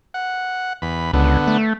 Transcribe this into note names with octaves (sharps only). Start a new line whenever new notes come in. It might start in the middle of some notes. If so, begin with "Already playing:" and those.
F#5
E2 B5
C#2 D3 B3
A3